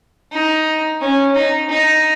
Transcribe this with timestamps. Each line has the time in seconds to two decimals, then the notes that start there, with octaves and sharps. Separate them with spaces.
0.32 D#4
1.01 C#4
1.35 D#4
1.69 D#4